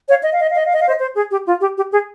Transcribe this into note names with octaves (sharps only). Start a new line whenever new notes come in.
C#5 F5
D#5
F5
D#5
F5
D#5
F5
D#5
F5
C5 D#5
C5
G#4
G4
F4
G4
G4
G#4